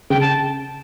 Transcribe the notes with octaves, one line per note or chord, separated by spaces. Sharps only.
C#3 G5
A5